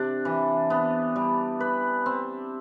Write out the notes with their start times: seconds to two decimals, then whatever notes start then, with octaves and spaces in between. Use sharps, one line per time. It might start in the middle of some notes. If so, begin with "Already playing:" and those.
Already playing: C3 D4
0.25 E3
0.70 B3
1.16 G3
1.60 B4
2.06 C4